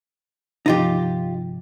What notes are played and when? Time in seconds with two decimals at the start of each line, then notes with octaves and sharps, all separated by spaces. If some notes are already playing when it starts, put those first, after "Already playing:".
0.66 G1 C3 F3 D#4 F4 G4